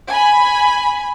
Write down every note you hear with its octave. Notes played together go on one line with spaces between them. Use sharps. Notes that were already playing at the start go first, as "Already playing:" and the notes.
G#5 B5